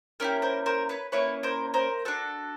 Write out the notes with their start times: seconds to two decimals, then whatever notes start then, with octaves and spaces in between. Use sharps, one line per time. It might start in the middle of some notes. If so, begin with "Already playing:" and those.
0.20 A#3 C#4 E4 G4 A#4
0.42 A#4 C5
0.66 A#4 C5
0.89 B4 C#5
1.12 A#3 C#4 E4 B4 C#5
1.43 A#4 C5
1.74 A#4 C5
2.05 D4 F#4 A4